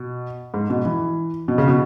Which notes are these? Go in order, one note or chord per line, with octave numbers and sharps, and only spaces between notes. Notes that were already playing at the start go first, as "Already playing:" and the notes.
Already playing: B2
G#2
B2
E3
B2
C#3
B2